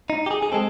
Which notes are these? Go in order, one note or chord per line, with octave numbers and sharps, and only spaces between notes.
D#4
G4
G#4
G#4
G#3 C4 A4